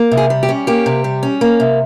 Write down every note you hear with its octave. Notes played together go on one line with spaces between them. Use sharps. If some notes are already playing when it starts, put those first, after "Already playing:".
Already playing: A#3
C3
G#4
G3
G4
C#4
A#3 G4
C3
G3
C#4
A#3
C3